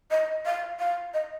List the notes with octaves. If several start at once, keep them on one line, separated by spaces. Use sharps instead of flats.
D#5
F5
F5
D#5